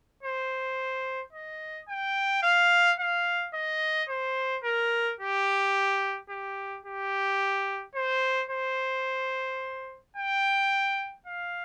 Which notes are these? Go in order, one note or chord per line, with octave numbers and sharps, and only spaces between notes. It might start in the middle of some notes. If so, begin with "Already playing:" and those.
C5
D#5
G5
F5
F5
D#5
C5
A#4
G4
G4
G4
C5
C5
G5
F5